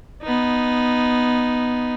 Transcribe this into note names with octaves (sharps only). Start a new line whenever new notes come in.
B3 D#4